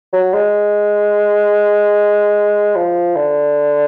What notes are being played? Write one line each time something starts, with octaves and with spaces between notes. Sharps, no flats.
F#3
G#3
F3
D3